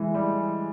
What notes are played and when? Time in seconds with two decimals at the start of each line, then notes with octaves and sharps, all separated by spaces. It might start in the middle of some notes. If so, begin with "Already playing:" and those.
Already playing: E3 G#3
0.15 G3